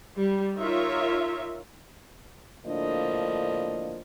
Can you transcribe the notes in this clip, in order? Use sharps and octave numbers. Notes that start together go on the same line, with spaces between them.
G3
D#4 F4 A#4 C#5 E5
A2 D3 F3 A#3 D4 D#5